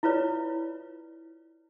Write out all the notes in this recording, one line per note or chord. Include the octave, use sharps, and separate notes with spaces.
E4 F4 B4 C#5 D5